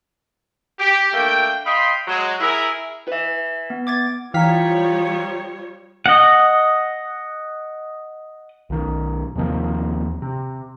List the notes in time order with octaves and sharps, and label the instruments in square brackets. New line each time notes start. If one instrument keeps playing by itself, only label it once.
[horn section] G4
A3 A#3 D4 G5
D#5 F5 G5 B5 C6
F#3 G#3
E4 G#4 A#4
[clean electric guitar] B4 E5
[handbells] B3
D6 G#6 A6
[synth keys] E3 F5 B6 [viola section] F3 G3 C#5 [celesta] G5 A#5
[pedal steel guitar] D#5 F#5
[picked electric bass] B1 D#3
D#2 C3 D#3 F3
C3